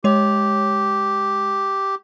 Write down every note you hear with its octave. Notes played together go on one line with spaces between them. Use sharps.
G#3 G4 C#5